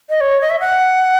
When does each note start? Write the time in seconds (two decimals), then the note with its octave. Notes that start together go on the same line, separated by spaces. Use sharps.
0.10 D#5
0.21 C#5
0.41 D#5
0.50 E5
0.60 F#5